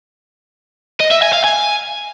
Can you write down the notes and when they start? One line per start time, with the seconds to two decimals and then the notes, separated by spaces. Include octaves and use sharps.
1.00 D#5
1.11 E5
1.22 G#5
1.33 F5
1.44 G#5